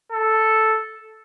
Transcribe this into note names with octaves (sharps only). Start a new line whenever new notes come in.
A4